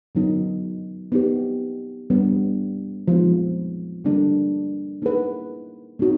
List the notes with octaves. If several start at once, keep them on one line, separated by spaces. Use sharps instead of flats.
D3 F#3 B3 D#4
B3 D#4 G4 B4
G3 B3 D4
F3 G#3 B3 D#4
D3 G3 A#3 D4
A#3 D#4 G#4 B4
A3 C4 D#4 F#4